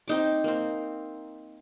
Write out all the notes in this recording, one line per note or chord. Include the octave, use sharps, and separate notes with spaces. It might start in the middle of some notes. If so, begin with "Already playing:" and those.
C4 D#4 D6
A#3 C4